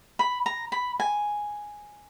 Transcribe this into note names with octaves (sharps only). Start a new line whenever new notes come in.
B5
A#5
B5
G#5